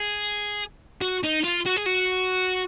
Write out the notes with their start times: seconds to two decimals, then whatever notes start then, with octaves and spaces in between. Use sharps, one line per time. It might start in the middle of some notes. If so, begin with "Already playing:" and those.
Already playing: G#4
1.02 F#4
1.23 D#4
1.44 F4
1.66 F#4
1.76 G#4
1.86 F#4